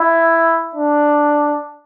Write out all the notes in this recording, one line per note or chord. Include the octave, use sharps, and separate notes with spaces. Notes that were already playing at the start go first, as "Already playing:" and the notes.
Already playing: E4
D4